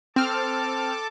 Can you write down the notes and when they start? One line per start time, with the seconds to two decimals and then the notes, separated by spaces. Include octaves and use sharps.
0.16 C4 A4 A5 D6 F6